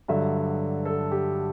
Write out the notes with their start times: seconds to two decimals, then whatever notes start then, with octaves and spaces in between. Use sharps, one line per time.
0.08 G2 D3 F#3 E5
0.85 A4
1.11 G4